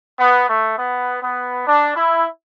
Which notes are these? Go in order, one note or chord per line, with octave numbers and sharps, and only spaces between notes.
B3
A3
B3
B3
D4
E4